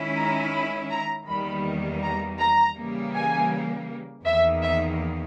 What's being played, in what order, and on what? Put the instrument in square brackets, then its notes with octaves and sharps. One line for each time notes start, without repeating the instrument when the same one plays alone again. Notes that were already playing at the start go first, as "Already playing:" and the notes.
Already playing: [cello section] D#3 G#3 C#4 E4
[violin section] A#5
B5
A#5
[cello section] E2 D#3 G3 A#3 [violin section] B5
[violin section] A#5
A#5
[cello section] C#3 E3 G3 A#3
[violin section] G#5
[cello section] E2 D#3 A#3 [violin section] E5
[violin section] E5